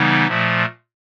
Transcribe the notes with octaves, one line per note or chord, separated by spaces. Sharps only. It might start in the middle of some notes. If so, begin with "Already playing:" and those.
Already playing: C#3 E3 G3 B3 D#4
A#2 F3 A3